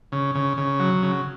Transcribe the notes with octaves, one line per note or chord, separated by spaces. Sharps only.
C#3
C#3
C#3
F#3
C#3